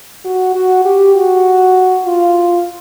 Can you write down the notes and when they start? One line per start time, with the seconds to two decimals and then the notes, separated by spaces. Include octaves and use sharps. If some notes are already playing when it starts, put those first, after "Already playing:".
0.25 F#4
0.55 F#4
0.85 G4
1.15 F#4
2.05 F4